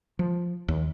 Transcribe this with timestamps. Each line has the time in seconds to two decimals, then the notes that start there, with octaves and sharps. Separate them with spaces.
0.19 F3
0.68 D#2